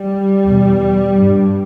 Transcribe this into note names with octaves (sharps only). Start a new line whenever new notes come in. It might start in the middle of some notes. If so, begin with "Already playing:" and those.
Already playing: G3
E2 B2
G2